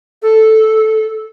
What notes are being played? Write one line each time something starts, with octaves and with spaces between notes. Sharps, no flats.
A4